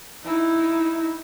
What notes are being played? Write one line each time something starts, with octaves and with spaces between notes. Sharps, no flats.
D#4 E4